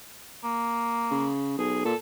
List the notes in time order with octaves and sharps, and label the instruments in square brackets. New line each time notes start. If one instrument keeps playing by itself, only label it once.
[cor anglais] A#3
[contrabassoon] C#3
[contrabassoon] B1 [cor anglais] G#4
[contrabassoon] A#2 [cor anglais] A4